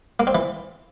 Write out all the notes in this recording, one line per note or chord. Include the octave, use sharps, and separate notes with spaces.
A#3
C4
E3